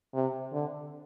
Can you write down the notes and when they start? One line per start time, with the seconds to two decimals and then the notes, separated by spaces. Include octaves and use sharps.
0.14 C3
0.52 D3